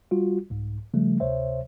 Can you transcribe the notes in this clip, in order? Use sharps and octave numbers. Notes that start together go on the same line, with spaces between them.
G3 F4 F#4
C2 G#2
C#3 F3 G3 A3
D2 C3 C5 C#5 E5